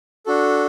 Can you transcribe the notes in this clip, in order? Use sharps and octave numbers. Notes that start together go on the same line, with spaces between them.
D4 F#4 A4